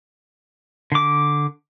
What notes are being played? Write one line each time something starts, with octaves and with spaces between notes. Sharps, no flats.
D3 D6